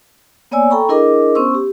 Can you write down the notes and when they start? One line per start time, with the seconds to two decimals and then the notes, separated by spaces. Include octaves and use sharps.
0.51 A#3 B3 C#5 D5 G#5 E6
0.70 A4 G5 A#5 B5 C#6
0.89 D4 E4 G#4 A#4 D#5 D6
1.35 B3 C#4 C5 C6 C#6 E6
1.54 G4